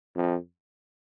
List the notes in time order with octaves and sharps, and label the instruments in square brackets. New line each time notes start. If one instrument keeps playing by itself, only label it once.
[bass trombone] F2